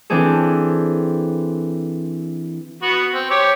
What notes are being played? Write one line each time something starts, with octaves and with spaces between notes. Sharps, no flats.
E3 C4 D4 G#4 A4
B3 F#4
C4
G4 C#5 C#6